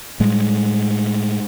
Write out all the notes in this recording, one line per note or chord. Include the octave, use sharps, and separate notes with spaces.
A2 G3 G#3